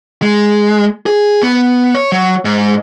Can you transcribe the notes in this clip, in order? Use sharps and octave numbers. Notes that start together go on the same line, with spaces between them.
G#3
G#4
B3
C#5
F#3
G#2